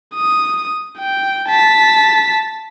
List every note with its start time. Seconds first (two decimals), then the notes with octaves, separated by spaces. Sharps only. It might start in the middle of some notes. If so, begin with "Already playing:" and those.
0.15 D#6
0.98 G5
1.48 A5 B6